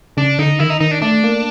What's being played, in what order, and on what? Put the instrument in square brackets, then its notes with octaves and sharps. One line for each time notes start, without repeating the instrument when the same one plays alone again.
[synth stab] C#3 [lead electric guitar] D4
[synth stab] D3 [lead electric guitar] D#4
[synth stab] D#3 [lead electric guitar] E4
[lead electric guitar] D#4
[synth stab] D#3 [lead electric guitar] D#4
[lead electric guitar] D4
[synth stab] A3 [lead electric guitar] D4
[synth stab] A#3